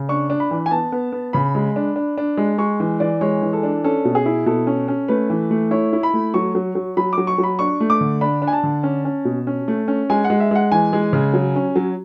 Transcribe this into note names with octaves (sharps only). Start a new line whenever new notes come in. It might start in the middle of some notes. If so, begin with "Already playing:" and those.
Already playing: C#3
D4 C#6
D4
B5
E3
G#5
B3 A5
B3
B3
C#3 B5
G#3
D4
D4
D4
G#3
G#3 C#6
E3
E3 D5
G#3 C#5
E3
A4
D4
C#4 A4
B2
G#4
E4
B2 A4
C#4
C#4
A3 B4
E3
A3
E4 C#5
E4
B5
A3
F#3 C#6
F#3
F#3
F#3 B5
D6
F#3
C#6
F#3
B5
D4 C#6
A3
D6
D3
D4 B5
D4
G#5
A5
D3
C#4
C#4
B2
C#4
A3
C#4
G#3 G#5
F#5
G#3
E5
G#3 F#5
E3 G#5
G#3
C#3
F#3
C#4
F#3